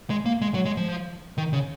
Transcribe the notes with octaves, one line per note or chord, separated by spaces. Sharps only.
G#3
A#3
G#3
F#3
G#3
F3
D#3
C#3